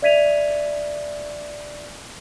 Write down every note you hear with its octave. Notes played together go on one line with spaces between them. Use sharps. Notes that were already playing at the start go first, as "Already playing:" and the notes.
D5 E5 G#6 B6 D#7 F7